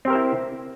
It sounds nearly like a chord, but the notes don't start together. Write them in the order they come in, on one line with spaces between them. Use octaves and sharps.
C4 G4 A#4 C5 E4